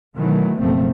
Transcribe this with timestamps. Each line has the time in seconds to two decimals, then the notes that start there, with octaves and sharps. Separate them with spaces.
0.16 B2 D#3 E3 F#3 A3
0.60 F#1 B2 F3 A3 C4